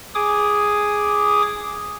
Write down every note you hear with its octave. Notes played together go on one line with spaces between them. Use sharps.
G#4 D6 D#6